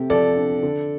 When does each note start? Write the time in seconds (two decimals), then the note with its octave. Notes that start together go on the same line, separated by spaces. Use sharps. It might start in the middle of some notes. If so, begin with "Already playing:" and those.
Already playing: C3 A3 G4
0.10 F3 A4 D5
0.37 D4
0.63 D3